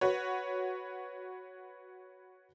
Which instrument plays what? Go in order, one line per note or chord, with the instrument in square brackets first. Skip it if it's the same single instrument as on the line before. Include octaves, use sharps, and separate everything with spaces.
[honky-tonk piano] F#4 B4 C#5